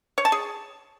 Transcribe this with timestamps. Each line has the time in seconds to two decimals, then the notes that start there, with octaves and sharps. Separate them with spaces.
0.18 C#5
0.25 A5
0.32 G#4